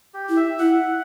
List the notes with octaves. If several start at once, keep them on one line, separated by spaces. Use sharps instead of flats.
G4
E4
E5
E4 F#5